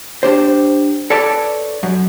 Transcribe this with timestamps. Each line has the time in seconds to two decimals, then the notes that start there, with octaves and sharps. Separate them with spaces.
0.23 D4 G4 C5
1.10 A4 B4 C#5 D5 A5
1.83 F#2